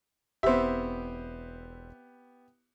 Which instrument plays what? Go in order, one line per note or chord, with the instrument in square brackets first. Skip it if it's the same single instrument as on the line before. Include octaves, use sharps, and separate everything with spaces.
[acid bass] E1 [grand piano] B3 E4 G4 [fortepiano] C4 E5